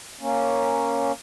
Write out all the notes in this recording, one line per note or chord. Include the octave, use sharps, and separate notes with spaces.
A#3 C#4